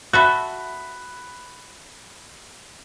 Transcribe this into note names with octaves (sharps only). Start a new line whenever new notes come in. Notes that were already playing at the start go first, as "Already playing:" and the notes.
F#4 A4 E5 B5 F#6